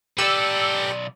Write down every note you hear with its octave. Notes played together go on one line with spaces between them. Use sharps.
B1 G4 A4 B4 D5 E6